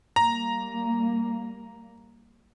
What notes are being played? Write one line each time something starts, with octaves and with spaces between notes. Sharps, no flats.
G3 A#3 A#5